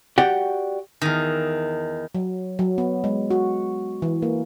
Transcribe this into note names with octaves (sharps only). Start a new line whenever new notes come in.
F#4 G4 D5 F#5 G5
E2 D#3
F#3
F#3
B3
G#3
F#4
E3
A#3